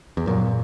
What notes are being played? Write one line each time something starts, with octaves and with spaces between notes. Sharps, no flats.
E2
F#2 A#2